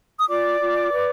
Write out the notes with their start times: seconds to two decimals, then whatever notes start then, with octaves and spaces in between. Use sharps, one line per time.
0.18 D#6
0.28 F4 D5 D6
0.60 F4
0.91 B4